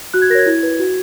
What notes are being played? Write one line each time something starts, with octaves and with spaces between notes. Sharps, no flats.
F#4 F#6
G#6
A#4 C#5 G#6 A#6
E4
B4
F#4